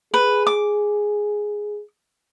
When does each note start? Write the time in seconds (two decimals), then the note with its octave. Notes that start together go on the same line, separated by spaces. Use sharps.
0.14 G#4 B4
0.47 D6